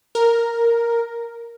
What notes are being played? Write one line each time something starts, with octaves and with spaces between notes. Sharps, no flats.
A#4